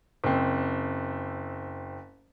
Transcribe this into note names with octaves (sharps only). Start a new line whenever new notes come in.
F#1 C4